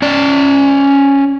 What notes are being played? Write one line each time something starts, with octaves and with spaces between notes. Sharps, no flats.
C#4 D5